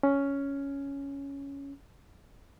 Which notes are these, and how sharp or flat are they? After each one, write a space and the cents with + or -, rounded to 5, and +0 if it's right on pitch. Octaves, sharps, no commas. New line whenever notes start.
C#4 +5